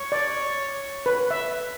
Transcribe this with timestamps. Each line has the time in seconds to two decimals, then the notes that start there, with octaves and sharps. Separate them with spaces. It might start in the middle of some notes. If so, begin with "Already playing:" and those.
Already playing: C#5
0.12 D5
1.06 B4
1.31 E5